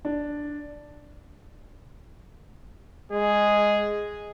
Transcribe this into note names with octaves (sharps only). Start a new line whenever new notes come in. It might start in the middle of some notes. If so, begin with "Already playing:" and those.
D4
G#3 G#4